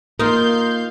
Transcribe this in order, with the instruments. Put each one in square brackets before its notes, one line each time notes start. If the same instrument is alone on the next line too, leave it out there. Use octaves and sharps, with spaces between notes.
[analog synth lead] A#3 [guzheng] D#4 F4 [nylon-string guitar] A#4 [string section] F5 C6 G6